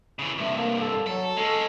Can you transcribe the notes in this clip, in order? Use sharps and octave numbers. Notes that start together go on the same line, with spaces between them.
C#3 E3
C2 G2 A3
A#3
A4
F#3 A4
G#3 C#4 A4